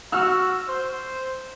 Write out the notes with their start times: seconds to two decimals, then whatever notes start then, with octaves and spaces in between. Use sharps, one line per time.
0.12 F#4 E6 F6
0.68 C5